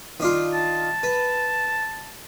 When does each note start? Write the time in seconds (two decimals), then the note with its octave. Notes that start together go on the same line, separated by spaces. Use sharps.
0.20 D#3 D4 F4
0.54 A5
1.03 B4